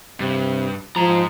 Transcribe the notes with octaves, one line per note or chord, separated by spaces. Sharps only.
G2 C3
G#2 F3 A#5